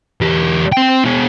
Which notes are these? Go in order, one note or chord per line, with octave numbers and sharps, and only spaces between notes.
E2 G4
C4 G5
B2 G#4